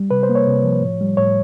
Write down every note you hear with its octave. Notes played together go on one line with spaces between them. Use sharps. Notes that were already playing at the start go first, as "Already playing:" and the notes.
Already playing: G3
C3 B4
C5
A#3
C#5
C3
F3
A2
G3
A2 C#5